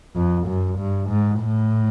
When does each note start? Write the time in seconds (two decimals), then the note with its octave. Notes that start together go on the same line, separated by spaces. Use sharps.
0.15 F2
0.47 F#2
0.78 G2
1.09 G#2
1.41 A2